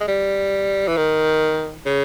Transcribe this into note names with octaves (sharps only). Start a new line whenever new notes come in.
G#3
G3
E3
D#3
C#3